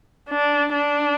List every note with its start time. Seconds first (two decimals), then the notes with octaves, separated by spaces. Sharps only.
0.29 D4
0.74 D4